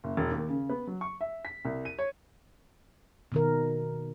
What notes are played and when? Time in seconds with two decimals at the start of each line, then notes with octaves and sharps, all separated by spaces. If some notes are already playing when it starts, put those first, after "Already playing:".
0.04 F#1
0.17 E1
0.31 D#2
0.48 C#3
0.69 B3
0.87 F#3
1.01 C#6
1.21 E5
1.45 B6
1.65 C2
1.85 D#7
1.99 C#5
3.32 B2 D#3 A#4